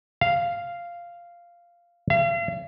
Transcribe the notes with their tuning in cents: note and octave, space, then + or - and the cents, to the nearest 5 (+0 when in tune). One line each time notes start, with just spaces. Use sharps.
F5 -5
F5 -40